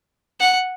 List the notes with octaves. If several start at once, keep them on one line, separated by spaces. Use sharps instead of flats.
F#5